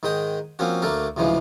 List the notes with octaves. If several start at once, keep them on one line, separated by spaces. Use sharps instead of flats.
G#2 D#3 G#3 G5 D#6
F3 A#3 C4 C#4 F#4
D2 A3 A#3 D4 A4 A#4
D2 A2 C#3 E3 F3 G#3